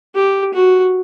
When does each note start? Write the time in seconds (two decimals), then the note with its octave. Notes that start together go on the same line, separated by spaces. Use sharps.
0.15 G4
0.53 F#4